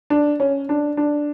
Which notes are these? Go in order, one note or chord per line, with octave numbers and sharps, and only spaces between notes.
D4
C#4
D4
D4